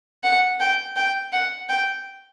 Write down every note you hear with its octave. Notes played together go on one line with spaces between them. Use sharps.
F#5
G5
G5
F#5
G5